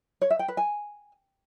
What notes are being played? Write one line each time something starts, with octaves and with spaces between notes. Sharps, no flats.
C#5
E5
G5
B4
G#5